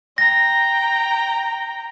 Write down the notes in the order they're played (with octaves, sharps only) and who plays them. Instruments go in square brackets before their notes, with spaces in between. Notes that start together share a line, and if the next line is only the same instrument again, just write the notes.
[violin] G5 A#5 [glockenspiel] A#6